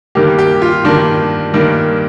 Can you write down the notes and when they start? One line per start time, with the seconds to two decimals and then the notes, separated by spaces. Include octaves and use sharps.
0.15 G2 D#3 A#3 G4
0.38 G4
0.62 F4
0.85 G2 D#3 A#3 D4
1.54 G2 D#3 A#3